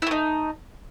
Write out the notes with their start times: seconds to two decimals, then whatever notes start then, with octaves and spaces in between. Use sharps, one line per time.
0.02 E4
0.07 A3
0.11 D#4